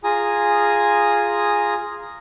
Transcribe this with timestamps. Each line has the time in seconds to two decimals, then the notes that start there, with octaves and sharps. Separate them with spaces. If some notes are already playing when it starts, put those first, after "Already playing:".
0.04 F4 G#4 G#5 A#5 D#6